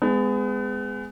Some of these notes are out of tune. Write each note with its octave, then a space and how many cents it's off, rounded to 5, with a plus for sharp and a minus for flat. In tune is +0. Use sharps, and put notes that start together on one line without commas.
G#3 +0 B3 +35